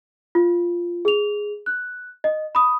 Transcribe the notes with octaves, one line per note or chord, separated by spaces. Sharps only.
F4
G#4 F7
F#6
D#5
B5 D#6